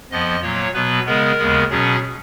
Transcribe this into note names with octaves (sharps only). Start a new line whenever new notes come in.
F2 F3 B3 D#5
A#2 F#3 A#3 C#5
B2 F#3 B3 B4
C#3 G#3 B3 A#4
D#2 C#3 G#3 B3
B2 F#3 C#4 G#4